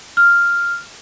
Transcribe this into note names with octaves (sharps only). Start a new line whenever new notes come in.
F6